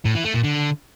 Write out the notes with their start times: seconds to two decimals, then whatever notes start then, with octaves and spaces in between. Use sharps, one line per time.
0.05 A2
0.15 E3
0.25 A3
0.34 A#2
0.44 D3